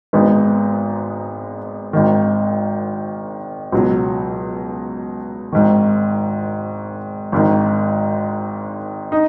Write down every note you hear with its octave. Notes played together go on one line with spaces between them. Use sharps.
G#1 G#2 G#3 B3 D#4
G#1 G#2 D#3
C#2 B2 F#3
G#1 G#2 D#3
G#1 G#2 D#3
D#4